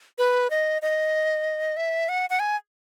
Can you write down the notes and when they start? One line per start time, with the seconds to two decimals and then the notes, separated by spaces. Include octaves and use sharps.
0.18 B4
0.50 D#5
0.82 D#5
1.77 E5
2.09 F#5
2.30 F#5
2.40 G#5